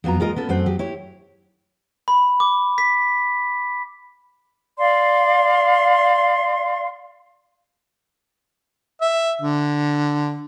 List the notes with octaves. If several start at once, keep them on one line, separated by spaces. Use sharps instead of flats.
F2 F#3 B3 F4 A#5
G#3 F4 A#4 D#5
B3 C#4 A4
F#2 A3 C4 C5 F#5
F#3 G4 G#4
E4 G4 C#5
B5
D6
B6
D5 F5 C6
E5
D3